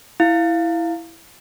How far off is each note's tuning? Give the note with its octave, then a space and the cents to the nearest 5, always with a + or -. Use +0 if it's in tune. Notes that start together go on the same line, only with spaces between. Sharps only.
E4 +0 F5 +0